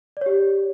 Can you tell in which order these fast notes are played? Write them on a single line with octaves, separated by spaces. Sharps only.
D5 C#5 G4